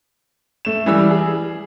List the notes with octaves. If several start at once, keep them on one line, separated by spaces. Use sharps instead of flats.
A3 E7
E3 G3 E6
G#4